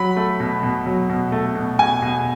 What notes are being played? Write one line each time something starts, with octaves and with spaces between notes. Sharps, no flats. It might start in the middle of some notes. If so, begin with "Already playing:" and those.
Already playing: F#3 B5
A3
B2
B2
F#3
B2
A3
B2
B2 G#5
B2